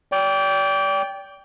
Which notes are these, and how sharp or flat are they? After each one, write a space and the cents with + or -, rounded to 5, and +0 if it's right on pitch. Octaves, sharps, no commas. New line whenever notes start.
D5 -35 G5 +0